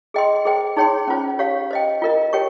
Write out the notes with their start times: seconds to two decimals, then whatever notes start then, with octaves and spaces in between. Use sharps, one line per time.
0.14 G#4 D#5 G5 C6
0.45 G#4 C5 G5
0.77 D#4 G#4 C#5 G5 C6
1.07 C#4 F4 C5
1.39 G4 C#5 F5
1.71 C5 D#5 G5
2.02 F4 A#4 D#5
2.33 G4 C#5 G5 C#6